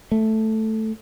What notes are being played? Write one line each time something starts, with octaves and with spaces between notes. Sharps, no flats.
A3